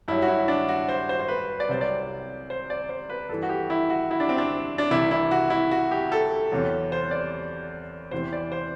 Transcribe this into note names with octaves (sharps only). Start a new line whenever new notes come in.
G2 F#3 E4
F#4
E4
D4
F#4
C5
C5
C5
B4
D5
C2 C3 F#3 C5
D5
C5
D5
C5
B4
G2 E3 A4
F#4
G4
E4
F#4
E4
D4
C4
D4
D4
C2 C3 E3 E4
E4
F#4
E4
F#4
G4
A4
E2 C3 F#3
C5
D5
E2 C3 E3 C5
D5
C5